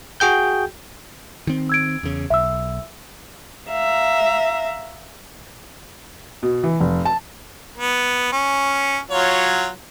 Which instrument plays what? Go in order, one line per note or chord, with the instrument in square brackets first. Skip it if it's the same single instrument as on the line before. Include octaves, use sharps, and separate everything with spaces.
[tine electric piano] F#4 G#4 G5 G6
[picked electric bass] D#3 C4
[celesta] E6 G#6 D7
[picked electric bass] E2 C#3
[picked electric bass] B1 [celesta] E5 E6
[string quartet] E5 F5 A#5
[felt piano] B2
E3
F1
A5
[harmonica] B3
C#4
F#3 F4 C#5